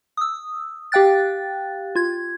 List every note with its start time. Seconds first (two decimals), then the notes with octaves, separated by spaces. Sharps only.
0.17 D#6 E6
0.92 G4 F5 G5 F#6 A6
1.95 F4 G#6